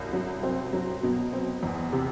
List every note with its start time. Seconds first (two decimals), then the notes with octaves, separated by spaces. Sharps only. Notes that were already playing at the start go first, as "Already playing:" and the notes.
Already playing: C2 F#3
0.13 F#3
0.43 C4
0.73 F#3
1.03 B2
1.33 C4
1.63 E2
1.93 C3